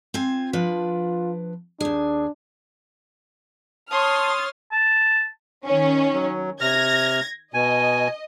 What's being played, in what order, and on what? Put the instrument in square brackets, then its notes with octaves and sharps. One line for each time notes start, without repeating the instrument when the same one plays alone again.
[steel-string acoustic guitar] C4 F4 G#5
[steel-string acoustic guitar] F3 D4 B4 [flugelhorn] F4
[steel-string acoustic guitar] D#2 G#4 [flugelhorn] D4
[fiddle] C#5 [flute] A5 [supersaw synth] C6 D#6 [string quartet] F6 A6
[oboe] A5
[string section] D#3 C#4
[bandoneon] F#3
[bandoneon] C3 F6 [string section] G#6 A#6
[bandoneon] B2 G#5 [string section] D#5